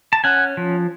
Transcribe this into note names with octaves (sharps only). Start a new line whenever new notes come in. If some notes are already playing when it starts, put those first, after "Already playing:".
A5
C#4 F#5 G#5
F3